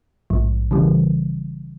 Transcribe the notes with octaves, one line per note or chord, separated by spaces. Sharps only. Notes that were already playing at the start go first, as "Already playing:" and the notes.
A#1 G#2 F3
C#3 E3 G3